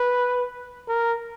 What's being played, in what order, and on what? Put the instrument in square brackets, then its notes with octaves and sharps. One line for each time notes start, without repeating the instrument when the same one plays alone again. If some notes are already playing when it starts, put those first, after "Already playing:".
Already playing: [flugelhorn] B4
A#4